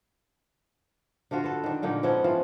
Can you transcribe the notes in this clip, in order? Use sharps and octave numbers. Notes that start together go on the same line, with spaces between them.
D3 D4 F4 F#4
A4 B4
D#3 D4
A#2 D3 A#3 D#4
F3 G#3 B3 C#4
E3 F3 F4